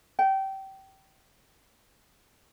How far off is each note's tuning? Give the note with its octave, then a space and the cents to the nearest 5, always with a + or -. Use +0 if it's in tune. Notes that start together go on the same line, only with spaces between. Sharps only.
G5 -25